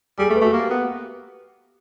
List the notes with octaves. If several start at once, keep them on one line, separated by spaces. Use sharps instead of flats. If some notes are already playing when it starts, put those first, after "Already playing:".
G3 G#4
A4
A3
B4
A3 F#4
A#3 G4
B3